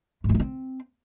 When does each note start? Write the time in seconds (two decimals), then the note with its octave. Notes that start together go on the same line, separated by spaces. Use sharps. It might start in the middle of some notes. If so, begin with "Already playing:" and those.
0.24 G#2
0.29 G#3
0.34 A3
0.40 C4